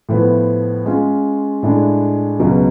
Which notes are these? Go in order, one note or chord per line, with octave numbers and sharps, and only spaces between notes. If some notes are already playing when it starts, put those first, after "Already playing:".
A2 F3 B3
G#3 C#4 F4
A2 G#3 D4
C#2 B2 F#3